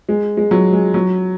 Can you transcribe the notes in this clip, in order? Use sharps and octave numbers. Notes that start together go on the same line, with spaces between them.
G#3
G#3
F#3
G#3
F#3